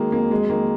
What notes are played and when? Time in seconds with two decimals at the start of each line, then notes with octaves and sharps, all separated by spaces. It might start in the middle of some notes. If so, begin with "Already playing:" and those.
Already playing: D#3 F#3 G#3 A#3
0.12 F2 A#3
0.31 F#3 G#3
0.50 D#3 A#3